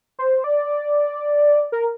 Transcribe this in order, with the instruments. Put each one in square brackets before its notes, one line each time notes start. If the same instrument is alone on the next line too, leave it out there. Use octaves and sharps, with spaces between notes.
[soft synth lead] C5
D5
A#4